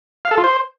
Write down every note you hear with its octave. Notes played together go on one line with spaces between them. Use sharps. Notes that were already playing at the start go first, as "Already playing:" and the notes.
F5
A4
F4
C5